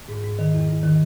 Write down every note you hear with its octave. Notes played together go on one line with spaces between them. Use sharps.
G#2
G#2
D#3
E2
E2
D#3